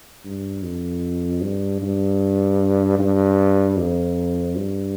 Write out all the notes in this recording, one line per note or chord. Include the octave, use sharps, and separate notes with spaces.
G2
F2
G2
G2
G2
F2
G2